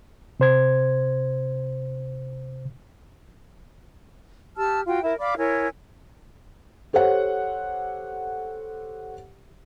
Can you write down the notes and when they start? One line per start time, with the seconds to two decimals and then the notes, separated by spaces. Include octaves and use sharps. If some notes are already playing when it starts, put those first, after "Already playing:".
0.40 C3 C5 G#6
4.57 G4 A5 E6 F6
4.87 F4 F#4 G5
5.03 E4 A#4
5.19 D5 F5 B5 D6
5.37 E4 A#4 C#5 G#5
6.93 G4 A4 C5 C#5 F#5